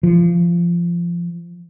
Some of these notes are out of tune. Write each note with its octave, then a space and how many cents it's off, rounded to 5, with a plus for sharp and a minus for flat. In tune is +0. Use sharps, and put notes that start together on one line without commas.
F3 -20